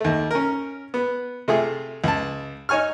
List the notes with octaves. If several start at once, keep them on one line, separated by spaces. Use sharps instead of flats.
D#2 A3
C#4 A#4
B3
C3 A3 F4 G#4
C#2 A5
D#4 C#5 G#5 C#6 F6